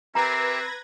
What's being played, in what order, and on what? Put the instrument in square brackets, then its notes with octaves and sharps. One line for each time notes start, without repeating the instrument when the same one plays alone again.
[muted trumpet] C4 [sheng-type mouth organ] G4 A#4 E5 [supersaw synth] B4 G#6 A#6 [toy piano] A#5